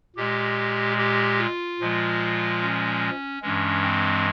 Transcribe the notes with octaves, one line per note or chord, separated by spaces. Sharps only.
A#2 G#3 G4
G4
F4
A#2 F3 G#3
C#4
G2 E3 G#3 C#4
C4